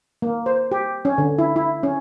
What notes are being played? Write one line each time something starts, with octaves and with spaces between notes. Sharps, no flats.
A#3
C5
G4
C#4
D3
E4
E4
C#4